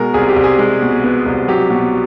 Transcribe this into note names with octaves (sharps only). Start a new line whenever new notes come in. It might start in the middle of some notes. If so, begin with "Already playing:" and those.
Already playing: B2 G#3 A#4
C2 G#4
G4
C2
G#4
G#3
B2
B3
C2
F#3 G4
B2